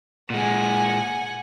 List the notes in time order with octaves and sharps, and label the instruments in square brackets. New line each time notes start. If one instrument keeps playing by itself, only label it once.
[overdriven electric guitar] A#2 G#3 [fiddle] F#5 G#5